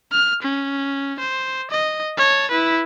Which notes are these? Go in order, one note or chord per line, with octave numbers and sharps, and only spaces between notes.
F6
C#4
C5
D#5
C#5 A5
E4 B4